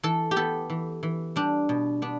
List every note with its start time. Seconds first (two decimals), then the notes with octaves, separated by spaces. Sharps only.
0.03 E3 A4
0.31 G4
0.36 B3 A4
0.70 E3
1.03 E3
1.36 G3 D4
1.69 B2
2.02 B3 D4